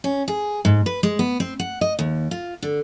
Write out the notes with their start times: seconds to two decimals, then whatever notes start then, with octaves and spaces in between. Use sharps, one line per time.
0.04 C#4
0.28 G#4
0.65 G#2
0.86 B4
1.03 G#3
1.19 B3
1.40 C4
1.59 F#5
1.81 D#5
1.99 D#2
2.31 F4
2.63 D3